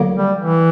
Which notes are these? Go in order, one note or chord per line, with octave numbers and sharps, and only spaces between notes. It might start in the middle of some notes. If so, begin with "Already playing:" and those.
Already playing: D2 D3 F#3 A#3
G3
E3